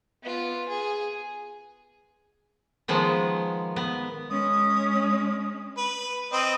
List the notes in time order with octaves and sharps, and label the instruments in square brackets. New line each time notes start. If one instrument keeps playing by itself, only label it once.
[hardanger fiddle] B3 F4
G#4
[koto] D#3 F3 G#3 B3
B3
[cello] G#3 C#4 [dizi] D#6
[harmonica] B4
C4 B4 D#5